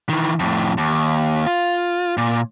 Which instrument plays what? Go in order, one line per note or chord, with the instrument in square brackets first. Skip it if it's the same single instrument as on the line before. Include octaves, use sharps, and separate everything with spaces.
[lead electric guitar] D#3 E3
F2 A2
D#2
F4
A#2